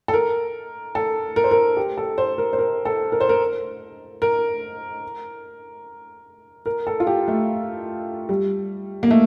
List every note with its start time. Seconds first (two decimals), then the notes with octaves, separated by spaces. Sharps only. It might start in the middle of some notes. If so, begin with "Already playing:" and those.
0.08 A4
0.14 A#4
0.95 A4
1.36 A#4
1.44 C5
1.51 A#4
1.77 G4
1.98 A4
2.18 C5
2.38 A#4
2.53 C5
2.59 A#4
2.85 A4
3.12 A#4
3.21 C5
3.29 A#4
4.22 A#4
6.66 A#4
6.87 A4
7.00 F4
7.07 G4
7.28 A3
8.29 G3
9.03 A#3
9.11 A3